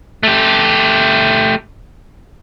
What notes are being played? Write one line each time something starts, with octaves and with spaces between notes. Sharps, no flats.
A3 G4